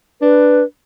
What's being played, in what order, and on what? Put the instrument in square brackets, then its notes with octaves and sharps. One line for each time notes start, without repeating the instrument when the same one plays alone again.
[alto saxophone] D4 [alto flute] B4